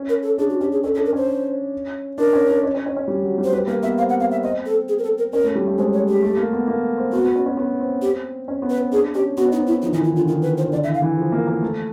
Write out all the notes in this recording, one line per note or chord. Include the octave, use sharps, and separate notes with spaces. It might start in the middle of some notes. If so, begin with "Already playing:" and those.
Already playing: C#4
A#4
A4
D4 G#4
F#4
C#4 G4
G#4
C#4 A4
A4
D4
A#4
C#4 C5
D4 A#4
C#4
D4
C#4
C#4
C#4
C#4
G3
F#3
G3
C5
G3 B4
A#3 B4
B3 E5
C4 F5
F#5
B3 F5
E5
C4 D#5
A4
G#4
A#4
A4
A#4
C#4 A#4
A3
G3
A3
G#3 C5
C#5
G4
A3
A#3
B3
A#3
C4
B3 F#4
B3
C#4
C#4
B3
C4
G4
C#4
B3
B4
C4
D4 G#4
C#4 G4
B3 F#4
C#4 D#4
C4
E4
B3
F3 D#4
E3 D#4
D#3
E4
D3 F4
D#3 F4
B4
C5
D#3
D3 D5
E5
E3
F5
E3
F3
A#3
A#3
A3